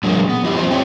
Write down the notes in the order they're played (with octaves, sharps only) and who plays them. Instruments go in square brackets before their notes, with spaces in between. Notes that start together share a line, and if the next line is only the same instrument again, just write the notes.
[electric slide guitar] A#2 D3 F#3 G#3 A#3
B3
F3 E4 G4 D#5
F#3 C4 D#4 F4 G4 C5
A3 C4 C#5 D#5 G5